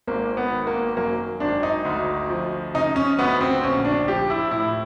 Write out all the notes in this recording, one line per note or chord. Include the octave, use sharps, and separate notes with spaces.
G#1 A#3
B3
D#3
A#3
F#2 A#3
G#1 D4
D#4
D2
F3
C#3 D#4
C#4
D2 B3
C4
A#1 C#4
D4
F3 G4
E4
A2 E4